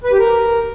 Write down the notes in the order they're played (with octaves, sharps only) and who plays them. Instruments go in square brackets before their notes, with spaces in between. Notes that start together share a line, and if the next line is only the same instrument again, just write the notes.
[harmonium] B4
G4
A#4